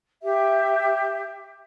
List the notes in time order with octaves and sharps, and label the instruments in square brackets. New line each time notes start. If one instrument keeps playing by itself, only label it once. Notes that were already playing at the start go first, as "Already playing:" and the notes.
[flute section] G4 E5